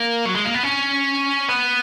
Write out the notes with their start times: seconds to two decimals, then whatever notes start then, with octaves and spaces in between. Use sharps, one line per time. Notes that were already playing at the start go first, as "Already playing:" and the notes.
Already playing: A#3
0.26 F#3
0.36 G#3
0.45 A#3
0.54 B3
0.64 C#4
1.49 B3